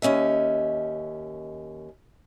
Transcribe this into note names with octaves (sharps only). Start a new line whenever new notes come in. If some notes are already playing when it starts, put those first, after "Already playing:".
D#2 C#4 D#5 E5